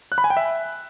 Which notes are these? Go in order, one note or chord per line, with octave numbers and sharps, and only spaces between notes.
F#6
B5
G#5
G5
E5